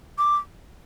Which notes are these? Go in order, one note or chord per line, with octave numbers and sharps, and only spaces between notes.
D6